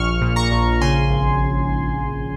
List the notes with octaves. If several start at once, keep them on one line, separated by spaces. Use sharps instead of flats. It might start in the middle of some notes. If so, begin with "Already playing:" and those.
Already playing: A#1 C#6 F6
A#2
A#5 C#6
A#1
C#3 G#5 C6
G#1